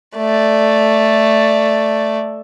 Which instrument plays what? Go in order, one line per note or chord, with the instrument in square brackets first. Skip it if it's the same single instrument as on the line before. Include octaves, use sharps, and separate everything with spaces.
[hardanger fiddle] A3 D5